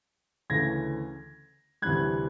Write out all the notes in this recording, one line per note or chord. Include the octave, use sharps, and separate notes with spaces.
D2 C#3 E3 A3 G#6 A#6
D2 C3 E3 G3 F#6 G#6